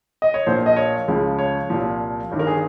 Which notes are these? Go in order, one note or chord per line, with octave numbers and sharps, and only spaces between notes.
D#5
C#5
A#1 A#2 F3 C5
D#5
C#5
C#2 C#3 F3
C#5
C2 A#2 F3
G1 G2 D#3
A#4
G#4